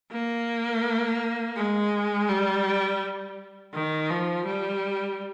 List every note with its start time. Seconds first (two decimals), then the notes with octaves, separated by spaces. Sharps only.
0.11 A#3
1.56 G#3
2.29 G3
3.74 D#3
4.10 F3
4.46 G3